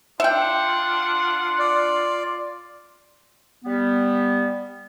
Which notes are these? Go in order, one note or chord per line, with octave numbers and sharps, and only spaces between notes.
D4 F4 E5 F#5 G5
D5
G3 B3